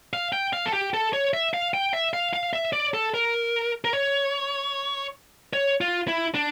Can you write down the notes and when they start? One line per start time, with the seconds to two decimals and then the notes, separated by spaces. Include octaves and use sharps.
0.13 F5
0.33 G5
0.53 F5
0.66 A4
0.73 G4
0.94 A4
1.13 C#5
1.34 E5
1.54 F5
1.74 G5
1.94 E5
2.13 F5
2.33 F5
2.53 E5
2.73 D5
2.94 A4
3.14 A#4
3.85 A#4
3.93 C#5
5.53 C#5
5.81 F4
6.08 E4
6.35 D4